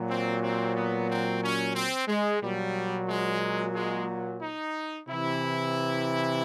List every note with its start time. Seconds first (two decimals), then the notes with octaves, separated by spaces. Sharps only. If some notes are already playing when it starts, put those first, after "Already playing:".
Already playing: A#2 F#3
0.09 C4
0.43 C4
0.76 B3
1.09 C4
1.43 C#4
1.75 C4
2.08 G#3
2.42 A#2 F#3 G3
3.08 G#3
3.75 G#3
4.42 D#4
5.08 C3 E3 E4